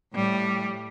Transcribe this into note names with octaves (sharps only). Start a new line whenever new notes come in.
A2 G3